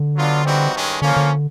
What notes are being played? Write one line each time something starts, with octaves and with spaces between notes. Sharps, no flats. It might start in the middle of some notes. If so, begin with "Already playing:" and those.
Already playing: D3
F#3 B3 D4 F4
E3 G3 C4 D#4 F#4
G2 D#3 G#3 C#4
D3 F3 A#3 C#4
D3